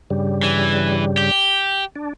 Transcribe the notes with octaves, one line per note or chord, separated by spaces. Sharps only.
G2 C#3 G3
E3
G4
D4